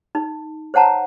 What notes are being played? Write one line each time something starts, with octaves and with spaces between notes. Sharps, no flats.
D#4
C5 C#5 F#5 A5 A#5